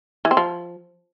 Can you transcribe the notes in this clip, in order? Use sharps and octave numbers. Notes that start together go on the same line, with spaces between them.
E3
C4
F3